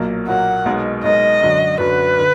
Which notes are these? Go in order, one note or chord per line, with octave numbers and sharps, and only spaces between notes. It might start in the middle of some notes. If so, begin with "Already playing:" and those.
Already playing: B1 A#2 F#3 A#3
B1 A#2 F#3 A#3 F#5
B1 B2 G#3 D#4 A#4
B1 B2 G#3 D#4 A#4 D#5
F#2 D3 F#3 D4 F#4
F#2 D3 F#3 D4 F#4 B4
D3